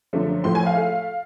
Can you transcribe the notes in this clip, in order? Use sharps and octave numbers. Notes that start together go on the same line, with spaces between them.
F#2 D3 F3 A3
A2 F3 A3 C6
G#5
F5
A3